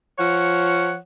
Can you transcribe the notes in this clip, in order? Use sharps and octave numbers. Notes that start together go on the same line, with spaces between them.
F3 C#5 F#5